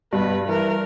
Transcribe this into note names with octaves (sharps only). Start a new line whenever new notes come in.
G2 B2 B4
E3 A#4